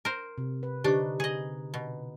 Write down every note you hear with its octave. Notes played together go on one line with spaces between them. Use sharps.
A#4 C5
C3
B4
D3 D4 D#4 G4 C5 C#6
G#4 D#5
B2